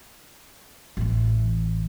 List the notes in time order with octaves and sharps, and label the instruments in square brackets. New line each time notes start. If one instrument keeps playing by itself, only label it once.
[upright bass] A1 E3